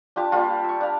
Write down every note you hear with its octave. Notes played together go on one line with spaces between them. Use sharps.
D4 F4 G4 A5
G3 A#3 F4
C#6 E6
D4 F5